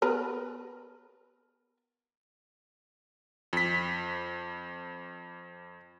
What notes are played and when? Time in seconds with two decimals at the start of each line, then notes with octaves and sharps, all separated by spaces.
0.02 B3 A#4 B4
3.53 F2 B6